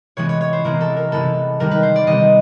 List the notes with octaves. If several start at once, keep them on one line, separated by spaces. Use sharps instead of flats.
C3 E3 G#3 B3 C#5
C#5
C#5
C5
C3 E3 G#3 B3 A#4
A4
A#4
C3 E3 G#3 B3 A4
C3 D#3 G3 B3 A#4
B4
C5
D5
C3 D#3 G3 B3 D#5